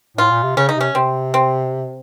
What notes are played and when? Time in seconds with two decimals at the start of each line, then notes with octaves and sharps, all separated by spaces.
0.17 A2 F4
0.31 A#2
0.43 C3
0.57 C#3 C#4
0.69 D#4
0.76 C3 C#4
0.95 C3 C4
1.34 C4